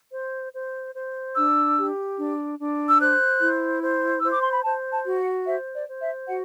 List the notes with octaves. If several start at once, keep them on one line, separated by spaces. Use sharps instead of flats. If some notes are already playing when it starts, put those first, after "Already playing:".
C5
C5
C5
D4 E6
G4
D4
D4
E6
C5 F#6
E4
C5
C5 E6
D6
C6
B5
C5 A5
A5
F#4
F#5
C5 E5
D5
C5
E5
F#4 F#5